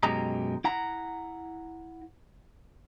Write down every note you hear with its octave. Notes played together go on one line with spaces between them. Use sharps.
F#2 B2 G#3 G4 D#5 A#5
E4 F#5 A#5